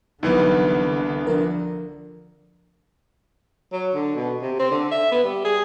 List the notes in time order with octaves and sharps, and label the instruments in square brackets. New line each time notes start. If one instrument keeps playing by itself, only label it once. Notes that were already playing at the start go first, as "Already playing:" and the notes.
[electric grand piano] C2 E3 B3 [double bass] D3 [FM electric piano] F#3 D#4
[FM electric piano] F3 D4 A#4
[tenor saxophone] F#3
D3
B2
C3
C4
D3
E5
B3
G3
G#4